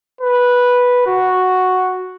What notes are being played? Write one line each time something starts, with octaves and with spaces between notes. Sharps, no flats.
B4
F#4